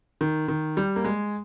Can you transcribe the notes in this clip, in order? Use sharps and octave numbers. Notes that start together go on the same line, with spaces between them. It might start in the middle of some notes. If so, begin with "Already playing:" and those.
D#3
D#3
G3
A#3
G#3